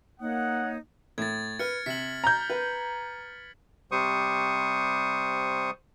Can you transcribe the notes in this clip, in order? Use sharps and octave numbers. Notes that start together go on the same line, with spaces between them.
A#3 D#4 C#5 F#5 D#6
A2 G#6 A6
B4 F6 C#7
C3 B6 F#7
A#5 G6
B4
C3 G3 C5 C#6 D#6